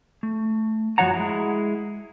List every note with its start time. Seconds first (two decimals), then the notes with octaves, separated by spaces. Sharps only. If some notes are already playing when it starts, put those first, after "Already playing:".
0.23 A3
0.98 F#2 F3 F#4 C#5 F#5 A#5
1.13 G#3 E4